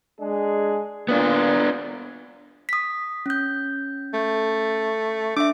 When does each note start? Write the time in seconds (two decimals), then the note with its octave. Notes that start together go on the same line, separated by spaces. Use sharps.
0.19 G#3 D4 G#4
1.08 A#2 B3 D4
2.69 D#6 B6
3.26 C#4 G6
4.14 A3
5.37 D4 E5 D6